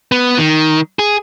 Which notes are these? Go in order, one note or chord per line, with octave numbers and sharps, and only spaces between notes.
B3
D#3
G#4